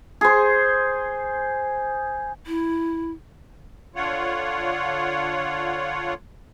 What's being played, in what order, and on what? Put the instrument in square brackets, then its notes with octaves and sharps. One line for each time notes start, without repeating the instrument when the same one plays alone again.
[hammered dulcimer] G#4 C5
[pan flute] E4
[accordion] D3 F4 C#5 F#5